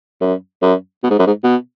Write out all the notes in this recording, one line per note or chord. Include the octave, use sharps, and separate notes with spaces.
F#2
F#2
B2
G#2
F#2
G#2
B2